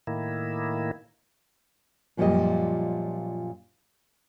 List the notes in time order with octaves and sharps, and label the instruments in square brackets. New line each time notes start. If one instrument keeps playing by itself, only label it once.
[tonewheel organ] A2 D#3 A#3 E4
[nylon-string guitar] F#2 A#2 F3 G3 G4 D#5